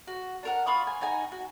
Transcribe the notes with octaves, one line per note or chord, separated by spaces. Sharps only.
F#4
D4 A#4 F#5
F4 B5 C#6 D#6
G#5
D#4 F#5 G#5 A#5
F#4